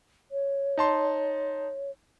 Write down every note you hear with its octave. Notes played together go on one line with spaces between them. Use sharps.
C#5
D#4 A5 C6